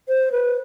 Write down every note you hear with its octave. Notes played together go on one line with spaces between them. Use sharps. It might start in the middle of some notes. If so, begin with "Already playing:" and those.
C5
B4